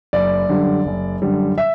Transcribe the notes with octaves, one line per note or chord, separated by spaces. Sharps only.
F#1 D5
F#2 D3 G3
F#1
F#2 D3 G3
E5